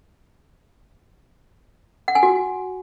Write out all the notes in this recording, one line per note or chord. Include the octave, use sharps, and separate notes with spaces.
F#5
G#5
F#4